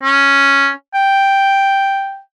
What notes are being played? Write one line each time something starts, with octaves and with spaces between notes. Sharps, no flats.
C#4
G5